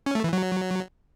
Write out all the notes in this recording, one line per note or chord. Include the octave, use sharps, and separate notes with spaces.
C#4
A3
E3
F#3